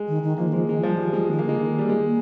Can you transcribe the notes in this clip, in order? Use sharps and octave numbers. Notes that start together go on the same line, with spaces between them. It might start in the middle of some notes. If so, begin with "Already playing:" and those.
Already playing: G#3
D#3
D#3
F3 A#3
D#3
F3 G#3
D#3 G#3
F3 G3
F3 G3
F3 G#3
D#3 G#3
A#3
D3 G#3
D#3
G3
G#3
A#3